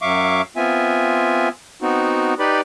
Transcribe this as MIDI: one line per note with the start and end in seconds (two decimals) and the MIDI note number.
0.02 0.42 42
0.02 0.42 54
0.02 0.42 76
0.02 0.42 77
0.02 0.42 85
0.02 0.42 86
0.56 1.49 59
0.56 1.49 60
0.56 1.49 65
0.56 1.49 76
0.56 1.49 80
1.82 2.34 59
1.82 2.34 60
1.82 2.34 63
1.82 2.34 66
2.39 2.61 63
2.39 2.61 67
2.39 2.61 71
2.39 2.61 74
2.39 2.61 83